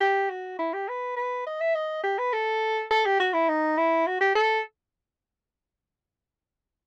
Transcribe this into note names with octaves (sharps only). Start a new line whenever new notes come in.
G4
F#4
E4
G4
B4
B4
D#5
E5
D#5
G4
B4
A4
A4
G4
F#4
E4
D#4
E4
F#4
G4
A4